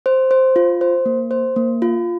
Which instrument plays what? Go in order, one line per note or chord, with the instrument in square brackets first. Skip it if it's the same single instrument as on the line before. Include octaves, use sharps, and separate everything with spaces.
[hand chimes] C5
C5
F4
C5
A#3
C5
A#3
F4